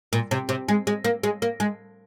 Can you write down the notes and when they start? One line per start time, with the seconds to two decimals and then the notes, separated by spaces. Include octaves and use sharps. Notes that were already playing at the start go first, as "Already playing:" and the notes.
0.13 A#2
0.31 C3
0.49 C3
0.68 G#3
0.87 G#3
1.04 A#3
1.23 G#3
1.42 A#3
1.60 G#3